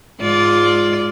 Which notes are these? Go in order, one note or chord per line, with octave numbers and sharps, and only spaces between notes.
G#2 F4 D5